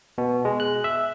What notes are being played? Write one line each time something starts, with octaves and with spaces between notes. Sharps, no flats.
B2
G#3
F#6
E5